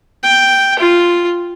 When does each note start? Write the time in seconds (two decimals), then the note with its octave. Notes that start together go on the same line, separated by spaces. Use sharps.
0.23 G5
0.79 F4